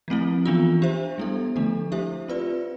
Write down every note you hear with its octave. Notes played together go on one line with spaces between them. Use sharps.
F3 A3 C4 E4
E3 B3 D4 F4
D4 G4 C5 E5
G3 B3 E4 A4
D3 F3 A3 D4 A4
A3 E4 G4 C5 E5
C4 F4 B4 D5